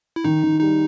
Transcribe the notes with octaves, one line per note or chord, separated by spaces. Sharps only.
E4
D#3 D#4
D#3
G3 D#4